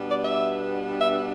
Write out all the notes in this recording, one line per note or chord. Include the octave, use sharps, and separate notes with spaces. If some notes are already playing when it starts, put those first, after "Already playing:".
Already playing: B2 G3 B3 D4
D5
E5
E5